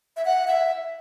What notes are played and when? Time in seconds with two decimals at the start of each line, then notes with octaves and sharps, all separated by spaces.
0.17 E5
0.25 F#5
0.48 E5